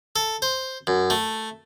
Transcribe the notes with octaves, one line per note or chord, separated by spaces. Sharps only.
A4
C5
F#2
A3